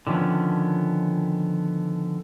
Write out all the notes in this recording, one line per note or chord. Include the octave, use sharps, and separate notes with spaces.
D3 D#3 F3 B3 C#4